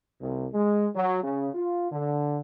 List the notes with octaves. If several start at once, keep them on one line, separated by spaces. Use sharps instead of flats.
C2
G#3
F#3
C#3
F4
D3